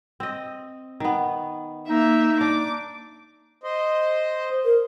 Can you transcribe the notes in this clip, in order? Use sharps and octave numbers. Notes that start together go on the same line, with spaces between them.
C4 D#5
D#3 B3
A#3 D#4 E5
D4 D6
C5 D#5
A#4